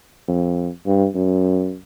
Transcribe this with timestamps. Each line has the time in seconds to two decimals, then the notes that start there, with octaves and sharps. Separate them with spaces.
0.28 F2
0.86 G2
1.15 F#2